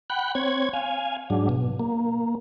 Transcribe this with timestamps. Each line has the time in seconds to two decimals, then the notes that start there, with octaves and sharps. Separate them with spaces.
0.10 F#5 G5 B5 F#6
0.35 C4 C#5 G#6
0.73 F5 G#5
1.30 G#2 F#3 D4
1.49 B2
1.79 A#3